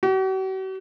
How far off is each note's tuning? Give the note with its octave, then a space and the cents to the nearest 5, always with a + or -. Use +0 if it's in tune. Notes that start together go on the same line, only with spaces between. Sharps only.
F#4 +45